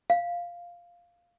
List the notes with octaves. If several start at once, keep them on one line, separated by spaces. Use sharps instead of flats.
F5